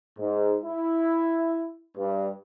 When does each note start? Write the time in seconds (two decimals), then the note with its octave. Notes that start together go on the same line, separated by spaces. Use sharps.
0.19 G#2
0.65 E4
1.96 G2